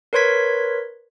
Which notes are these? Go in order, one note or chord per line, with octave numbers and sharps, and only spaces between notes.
A#4 B4 C#5 C6 G#6 B6